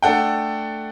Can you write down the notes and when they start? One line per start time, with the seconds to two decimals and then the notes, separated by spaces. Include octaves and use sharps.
0.02 A3 D4 A4 F#5 G5